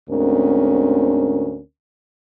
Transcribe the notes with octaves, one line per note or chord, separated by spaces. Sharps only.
D2 G#2 D3 C4 C#4 A#4